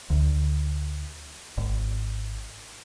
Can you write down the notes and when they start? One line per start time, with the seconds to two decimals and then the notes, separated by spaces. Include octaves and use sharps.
0.10 D2
1.57 G#1